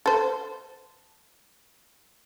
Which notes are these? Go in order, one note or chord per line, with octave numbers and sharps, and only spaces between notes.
A4 C5